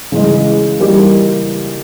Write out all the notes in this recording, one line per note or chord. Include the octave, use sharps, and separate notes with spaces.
C#3 E3 G#3
E3 G3 A#3 D#4 G4